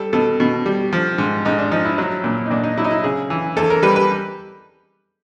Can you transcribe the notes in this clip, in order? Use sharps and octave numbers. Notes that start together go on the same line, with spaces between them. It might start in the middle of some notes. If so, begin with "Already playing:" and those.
Already playing: G3 A4
B2 A4
B2
G3
F3
G#2
G#2 D#4
D4
F3 D#4
E4
F#3
A#2
D#4
A#2 D4
D#4
F#3 E4
D#4
E4
C#3 G#4
E3
E2 A4
A#4
G3 B4
B4